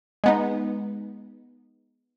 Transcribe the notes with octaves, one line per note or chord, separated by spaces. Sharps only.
G#3 B3 D#4